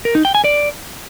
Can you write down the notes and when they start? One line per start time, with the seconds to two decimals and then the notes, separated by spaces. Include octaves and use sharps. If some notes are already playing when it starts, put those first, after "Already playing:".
0.05 A#4
0.15 D#4
0.25 G5
0.35 G#5
0.44 D5